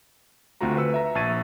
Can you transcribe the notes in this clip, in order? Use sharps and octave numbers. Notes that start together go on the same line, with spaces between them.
D2 A3 C4 F4 F#4 A#5
B4 E6 C#7
E5 A#5
A#1 A5 C#6 G#6 A6 D#7